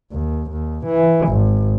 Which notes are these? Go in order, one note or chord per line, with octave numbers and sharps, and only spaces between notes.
D#2
D#2
E3
G#1